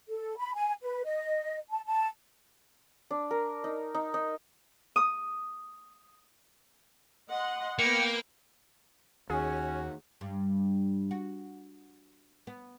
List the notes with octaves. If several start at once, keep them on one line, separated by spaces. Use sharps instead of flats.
A4
B5
G#5
B4
D#5
A5
A5
D4
A#4
D#4
D#4
D#4
D#6
D#5 F#5 C6
A#3 B3 B4 G5 C#7
D#2 C#4 F#4 G#4
G2
F#4
B3